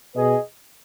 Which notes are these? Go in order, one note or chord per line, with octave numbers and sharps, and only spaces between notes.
B2 G#4 B4 D#5